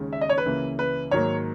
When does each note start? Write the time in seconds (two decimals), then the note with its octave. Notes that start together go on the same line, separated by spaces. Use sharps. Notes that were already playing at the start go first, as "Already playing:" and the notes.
Already playing: D#2 C#3 G#3
0.13 E5
0.21 D#5
0.29 C#5
0.38 B4
0.46 C#2 C#3 E3 A#3
0.79 B4
1.11 G#2 D#3 F#3 A#3 C#5